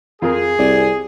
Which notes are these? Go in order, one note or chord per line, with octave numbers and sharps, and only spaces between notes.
F2 F4 G#4 A#4
C2 D5